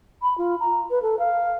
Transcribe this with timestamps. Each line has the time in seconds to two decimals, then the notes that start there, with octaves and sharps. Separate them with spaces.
0.22 B5
0.38 F4
0.60 A#5
0.90 B4
1.02 A4
1.19 F5